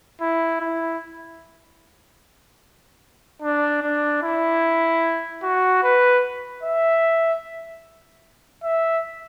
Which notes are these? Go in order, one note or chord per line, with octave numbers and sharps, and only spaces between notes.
E4
E4
D4
D4
E4
F#4
B4
E5
E5